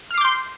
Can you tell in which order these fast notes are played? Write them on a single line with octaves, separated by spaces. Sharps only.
F6 C7 D6 G6 C6